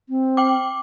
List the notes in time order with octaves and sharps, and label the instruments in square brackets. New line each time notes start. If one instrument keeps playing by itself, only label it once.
[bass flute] C4
[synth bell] G5 D6